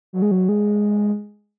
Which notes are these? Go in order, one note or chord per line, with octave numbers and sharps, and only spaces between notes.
F#3
G#3
F#3
G#3